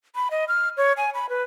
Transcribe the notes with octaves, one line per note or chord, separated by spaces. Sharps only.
B5
D#5
F6
C#5
G#5
B5
B4